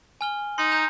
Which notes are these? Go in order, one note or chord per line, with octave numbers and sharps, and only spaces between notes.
G#5 F6 G7
D#4 C6
A#5 G6 F7